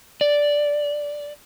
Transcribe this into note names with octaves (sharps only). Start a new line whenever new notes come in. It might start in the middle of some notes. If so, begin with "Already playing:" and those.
D5